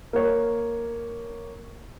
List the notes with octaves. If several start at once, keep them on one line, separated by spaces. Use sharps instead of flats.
A#3 C#5